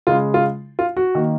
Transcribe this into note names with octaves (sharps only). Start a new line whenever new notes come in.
C#3 G#3 F4
F4
F4
F#4
D#3 A#3